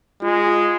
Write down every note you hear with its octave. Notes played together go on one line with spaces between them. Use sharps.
G#3 F4
F4